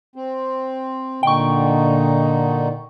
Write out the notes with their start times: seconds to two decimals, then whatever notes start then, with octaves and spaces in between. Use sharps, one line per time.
0.16 C4
1.23 A#2 D3 D#4 G5 C#6